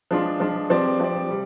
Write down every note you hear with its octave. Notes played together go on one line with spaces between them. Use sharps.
F3 G#3 D4 F4
F3 G#3 D4 F4
F3 C4 G4 D5
F3 C4 G4 D5
C3 G3